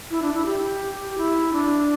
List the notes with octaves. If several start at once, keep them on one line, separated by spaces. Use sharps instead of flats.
E4
D4
E4
G4
E4
D4